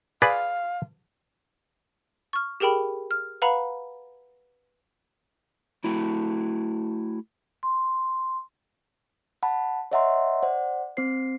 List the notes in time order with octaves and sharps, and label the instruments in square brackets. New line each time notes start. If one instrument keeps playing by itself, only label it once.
[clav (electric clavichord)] G#4 B4 D5 [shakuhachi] F5
[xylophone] C#6 F6
G4 G#4 A#4 G5 B5
F6
B4 F5 F#5 A#5 B5
[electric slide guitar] A3 E4 F#4
[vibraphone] C6
[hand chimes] F#5 A5 B5
C#5 D#5 E5 F#5 A#5 C6
C5 D5 F#5
C4 C5 C7